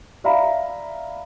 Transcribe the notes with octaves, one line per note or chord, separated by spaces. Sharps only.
D5 E5 F5 A#5 B5